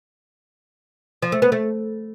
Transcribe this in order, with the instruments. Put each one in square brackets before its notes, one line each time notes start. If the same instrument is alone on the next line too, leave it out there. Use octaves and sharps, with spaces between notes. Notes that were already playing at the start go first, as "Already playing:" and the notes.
[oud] F3
A3
B3
A3